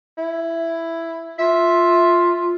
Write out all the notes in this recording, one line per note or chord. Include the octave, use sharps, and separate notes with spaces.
E4
F4 E5